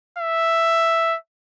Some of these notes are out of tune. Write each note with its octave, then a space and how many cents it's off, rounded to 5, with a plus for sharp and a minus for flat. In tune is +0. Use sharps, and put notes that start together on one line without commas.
E5 +5